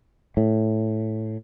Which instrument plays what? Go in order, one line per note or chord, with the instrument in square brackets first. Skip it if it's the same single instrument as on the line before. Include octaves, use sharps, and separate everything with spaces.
[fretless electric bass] A2